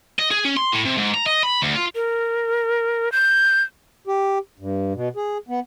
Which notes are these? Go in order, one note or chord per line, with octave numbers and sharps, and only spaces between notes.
D#5
G#4
C#4
C6
A2
C3
G#2
A#5
D#5
B5
D2
F4
A#4
G6
G4
G2
B2
G#4
B3